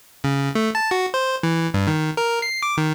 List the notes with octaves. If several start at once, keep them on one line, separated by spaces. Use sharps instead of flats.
C#3
A3
A5
F#4
C5
E3
G2
D#3
A#4
C7
D6
D#3